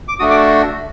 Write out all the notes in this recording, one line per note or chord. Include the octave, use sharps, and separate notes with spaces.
D6
A3 D4 F#4 D#6
D6